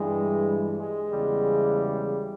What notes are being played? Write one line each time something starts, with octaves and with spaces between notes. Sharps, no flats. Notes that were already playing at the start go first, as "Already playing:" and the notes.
Already playing: G2 E3 G3 G#3
G#3
E2 C#3 G3